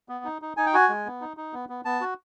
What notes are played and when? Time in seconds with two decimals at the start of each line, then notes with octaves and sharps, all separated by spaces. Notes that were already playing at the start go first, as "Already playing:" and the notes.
0.09 B3
0.25 D#4
0.42 D#4
0.57 D#4 G#5
0.66 G5
0.74 F#4 G#5
0.89 G#3
1.06 B3
1.21 D#4
1.37 D#4
1.53 B3
1.69 B3
1.85 B3 A5
2.01 F#4